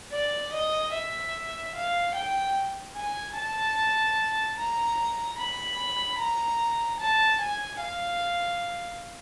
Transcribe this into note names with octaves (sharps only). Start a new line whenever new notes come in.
D5
D#5
E5
F5
G5
G#5
A5
A#5
B5
A#5
A5
G#5
F5